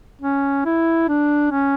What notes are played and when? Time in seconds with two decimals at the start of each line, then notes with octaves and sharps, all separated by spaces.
0.22 C#4
0.66 E4
1.08 D4
1.51 C#4